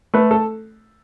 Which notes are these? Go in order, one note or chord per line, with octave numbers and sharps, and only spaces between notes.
A3 B4
A4